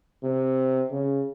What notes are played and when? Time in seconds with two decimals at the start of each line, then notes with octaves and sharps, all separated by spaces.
0.23 C3
0.91 C#3